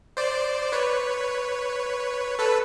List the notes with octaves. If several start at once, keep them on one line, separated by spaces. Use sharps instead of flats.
C5 D5
B4 C#5
A4 B4